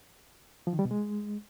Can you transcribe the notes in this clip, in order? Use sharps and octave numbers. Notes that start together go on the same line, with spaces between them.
F3
D#3
G3
B2
G#3